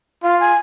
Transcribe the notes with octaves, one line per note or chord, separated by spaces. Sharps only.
F4 F5
G#5